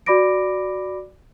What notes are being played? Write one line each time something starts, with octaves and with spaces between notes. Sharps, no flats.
F#4 D5 B5 D6 A#6 D7